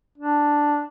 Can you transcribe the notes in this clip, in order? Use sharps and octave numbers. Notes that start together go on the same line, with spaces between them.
D4